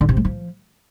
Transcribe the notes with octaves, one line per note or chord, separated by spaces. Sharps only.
D3
C3
G#3
F3